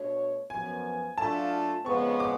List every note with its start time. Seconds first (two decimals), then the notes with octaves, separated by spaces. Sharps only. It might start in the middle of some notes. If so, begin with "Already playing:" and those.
Already playing: B2 A3 D4 F#4 C#5
0.50 F#2 F3 B3 G#5
1.18 F#3 A3 D4 F4 A5
1.86 F2 C#3 G#3 B3 C#6
2.20 D6